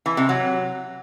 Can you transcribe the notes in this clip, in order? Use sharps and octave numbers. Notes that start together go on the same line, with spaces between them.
E3
C3
F#3